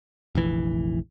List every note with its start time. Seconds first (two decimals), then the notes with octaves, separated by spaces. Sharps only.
0.35 F1 A#1 E3